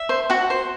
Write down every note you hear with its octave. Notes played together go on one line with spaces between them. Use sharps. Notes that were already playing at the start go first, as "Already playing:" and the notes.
Already playing: E5
C5
F#4 F#5
C5